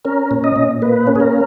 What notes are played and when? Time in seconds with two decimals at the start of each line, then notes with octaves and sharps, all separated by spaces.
0.05 C#4 A#4
0.31 A#2
0.44 D#5
0.56 A#2
0.82 A#3 B4
1.07 C#4
1.16 G#4
1.20 A#4